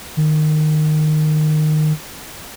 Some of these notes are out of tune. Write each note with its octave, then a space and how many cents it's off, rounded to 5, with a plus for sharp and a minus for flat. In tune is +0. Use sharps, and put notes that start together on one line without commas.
D#3 -20